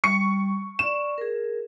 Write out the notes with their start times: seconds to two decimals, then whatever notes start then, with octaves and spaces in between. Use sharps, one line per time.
0.04 G3 C#6 C#7
0.79 D5 C#6 E7
1.18 G#4 A#4